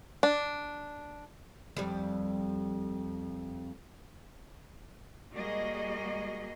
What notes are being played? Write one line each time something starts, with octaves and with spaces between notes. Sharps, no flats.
D4
F2 G3
G3 G#3 A#3 F#4 G#4 D#5